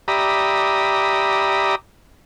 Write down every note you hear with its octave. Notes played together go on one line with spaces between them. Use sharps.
G4 D5 E5 A#5 B5 D#6